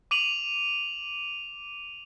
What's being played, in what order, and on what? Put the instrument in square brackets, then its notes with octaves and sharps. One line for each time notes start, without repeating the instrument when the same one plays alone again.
[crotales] D6 D#7 F7 F#7